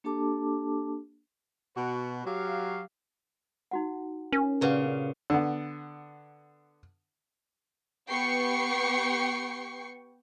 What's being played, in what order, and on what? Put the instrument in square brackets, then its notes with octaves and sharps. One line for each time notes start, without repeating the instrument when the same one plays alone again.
[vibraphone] A#3 D4 G4 A4 A5 D6
[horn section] B2 F#4 B4
F#3 G4 F5
[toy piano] D#4 F#4 F#5
[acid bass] C#4 [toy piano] A#4
[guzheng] A#2 C#3 [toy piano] G4 B4 F#5
[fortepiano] D3 B3
[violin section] B3 G4 G5 C#6 C7 C#7